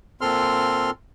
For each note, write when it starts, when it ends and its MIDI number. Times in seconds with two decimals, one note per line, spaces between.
0.21 0.90 46
0.21 0.90 60
0.21 0.90 69
0.21 0.90 84
0.21 0.90 89